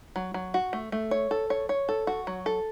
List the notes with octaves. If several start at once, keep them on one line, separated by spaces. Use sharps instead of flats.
F#3
F#3
F#4
A3
A3
C#5
A4
C#5
C#5
A4
F#4
F#3
A4